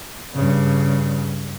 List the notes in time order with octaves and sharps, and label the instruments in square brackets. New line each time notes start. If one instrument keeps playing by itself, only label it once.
[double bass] G2 C#3